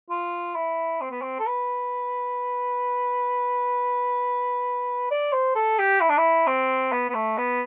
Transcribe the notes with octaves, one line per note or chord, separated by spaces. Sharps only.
F4
E4
C4
B3
C4
A4
B4
D5
C5
A4
G4
E4
D4
E4
C4
B3
B3
A3
B3